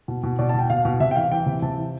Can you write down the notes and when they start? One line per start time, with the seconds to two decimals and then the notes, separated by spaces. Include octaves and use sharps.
0.08 B2
0.23 B2
0.39 B2 D5
0.49 A5
0.54 B2 G5
0.70 B2 F5
0.85 B2
1.00 C3 E5
1.11 G5
1.16 E3 F5
1.32 E3 G5
1.46 C3
1.62 C3 A5
1.77 E3